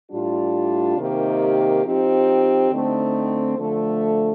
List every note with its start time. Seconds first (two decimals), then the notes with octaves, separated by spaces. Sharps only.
0.10 A2 G3 D4 F4
0.97 C3 D#3 A#3 D#4 G4
1.84 F3 C4 D#4 G4
2.69 D3 A3 C4 D#4
3.57 D3 F3 A3